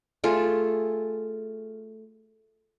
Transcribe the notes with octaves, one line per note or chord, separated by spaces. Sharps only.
A3 F4 G#4 A4